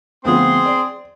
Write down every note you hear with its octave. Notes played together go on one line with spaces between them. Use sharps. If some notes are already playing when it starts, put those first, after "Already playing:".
D2 F3 B3 C4 G#4 C6
D5